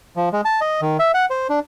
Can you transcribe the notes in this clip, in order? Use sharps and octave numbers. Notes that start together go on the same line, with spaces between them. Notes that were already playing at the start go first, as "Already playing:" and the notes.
F3
G#3
A5
D#5
D#3
E5
F#5
C5
D4